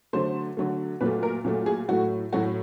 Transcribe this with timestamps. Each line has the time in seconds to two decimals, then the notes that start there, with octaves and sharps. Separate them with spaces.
0.13 D3 F#3 A3 C5
0.57 D3 F#3 A3
1.01 A#2 F#3 A3 B4
1.23 A#4
1.44 A#2 F#3 A3
1.66 G#4
1.88 A2 F#3 A3 F#4
2.32 A2 F#3 A3 F#4